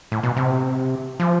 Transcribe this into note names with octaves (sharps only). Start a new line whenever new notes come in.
A2
B2
C3
F3